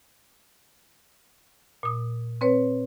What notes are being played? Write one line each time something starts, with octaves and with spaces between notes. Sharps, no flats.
A#2 D#6
C4 B4 C#5